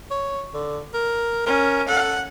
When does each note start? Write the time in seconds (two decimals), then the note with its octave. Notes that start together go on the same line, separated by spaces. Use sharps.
0.11 C#5
0.54 D3
0.94 A#4
1.46 C#4 A#4
1.88 A4 F#5